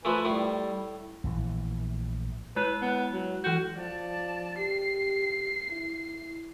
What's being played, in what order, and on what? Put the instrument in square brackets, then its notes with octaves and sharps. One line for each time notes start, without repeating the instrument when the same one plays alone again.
[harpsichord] F3 A3 [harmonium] B4 G#5
[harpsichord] A2 A3 [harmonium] G3
[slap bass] A#1 A2 E3
[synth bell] G#3 E4 F#6 [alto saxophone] B4
[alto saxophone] B3
F#3
[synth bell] E3 G6 [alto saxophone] F#4
[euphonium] F3 [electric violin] D5 A5
[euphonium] G4 [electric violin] C7
[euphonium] E4